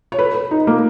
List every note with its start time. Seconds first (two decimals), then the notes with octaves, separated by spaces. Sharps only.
0.12 C#5
0.19 B4
0.35 B4
0.51 D#4
0.67 A#3